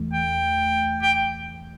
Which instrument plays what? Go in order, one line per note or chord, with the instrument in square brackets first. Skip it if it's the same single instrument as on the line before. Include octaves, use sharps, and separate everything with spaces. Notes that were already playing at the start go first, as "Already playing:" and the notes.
Already playing: [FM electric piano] E2 E3 A3
[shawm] G5
G5